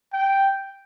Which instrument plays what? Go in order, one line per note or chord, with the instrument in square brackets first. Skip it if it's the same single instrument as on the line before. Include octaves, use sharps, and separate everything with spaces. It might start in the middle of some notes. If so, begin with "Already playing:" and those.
[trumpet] G5